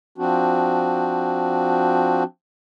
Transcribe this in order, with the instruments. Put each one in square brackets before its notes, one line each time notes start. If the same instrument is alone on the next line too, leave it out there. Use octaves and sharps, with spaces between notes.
[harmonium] F3 C4 D4 F#4